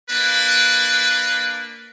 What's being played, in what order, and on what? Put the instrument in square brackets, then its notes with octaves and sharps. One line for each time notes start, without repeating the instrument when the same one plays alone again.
[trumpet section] A#3 D4 B4